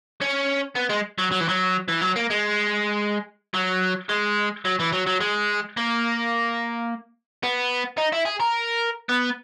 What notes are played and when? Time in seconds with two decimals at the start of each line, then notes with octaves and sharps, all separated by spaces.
0.21 C#4
0.76 B3
0.90 G#3
1.18 F#3
1.32 F#3
1.40 E3
1.49 F#3
1.88 E3
2.01 F#3
2.16 A#3
2.30 G#3
3.54 F#3
4.09 G#3
4.65 F#3
4.80 E3
4.93 F#3
5.07 F#3
5.21 G#3
5.77 A#3
7.43 B3
7.98 D#4
8.13 E4
8.26 G#4
8.41 A#4
9.09 B3